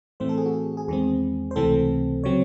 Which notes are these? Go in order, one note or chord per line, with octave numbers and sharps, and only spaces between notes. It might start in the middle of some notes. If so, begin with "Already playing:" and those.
A2 E3 A3 C4 C5
A4
G#4
F#4
G#4
G#4
E2 D#3 G#3 C4 G#4
C5
C#2 C3 E3 A3 C4 A4
C#3 F#3 C4 C#5